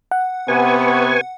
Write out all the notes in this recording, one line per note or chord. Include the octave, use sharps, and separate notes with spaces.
F#5
C3 B3 B4 G#5 C#6